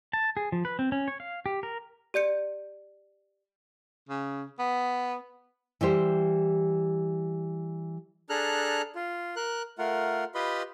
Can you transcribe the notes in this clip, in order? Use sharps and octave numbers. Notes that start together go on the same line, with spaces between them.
A5
G#4
F3
B4
C4
C#4
C#5
F5
G4
A#4
G4 D5 G6 C#7
C#3
B3
E3 G3 G4 C5
D4 G#4 A4 A#5 F6 F#6
F4
A#4 F#6
A3 F4 A#4 F#5
F4 G4 B4 D#5 B5 C6